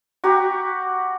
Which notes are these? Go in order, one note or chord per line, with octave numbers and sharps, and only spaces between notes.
F#4 G4 A#5